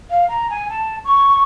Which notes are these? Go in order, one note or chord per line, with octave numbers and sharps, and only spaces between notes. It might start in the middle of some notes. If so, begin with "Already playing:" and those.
F5
A#5
G#5
A5
C#6